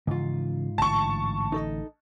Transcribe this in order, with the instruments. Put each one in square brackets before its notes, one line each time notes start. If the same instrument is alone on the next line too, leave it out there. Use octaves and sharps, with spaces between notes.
[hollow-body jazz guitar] G#2 F4 [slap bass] C#3 E3 F3
[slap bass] A1 D3 [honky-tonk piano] A5 C#6
[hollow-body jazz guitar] D#4 A4 D#5